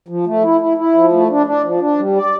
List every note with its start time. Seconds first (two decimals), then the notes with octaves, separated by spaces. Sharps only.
0.08 F3
0.27 A3
0.44 E4
0.61 E4
0.77 E4
0.94 F3
1.12 A3
1.30 D4
1.46 D4
1.64 F3
1.80 D4
1.98 G3
2.16 D5